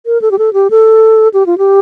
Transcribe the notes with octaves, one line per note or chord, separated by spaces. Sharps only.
A#4
A4
G4
A4
G4
A4
G4
F4
G4